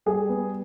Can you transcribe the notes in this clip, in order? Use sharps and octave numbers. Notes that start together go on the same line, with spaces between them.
G3 G#4
B3